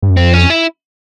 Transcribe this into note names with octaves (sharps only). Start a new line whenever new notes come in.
G2
F#2
F2 C4
C#4
E4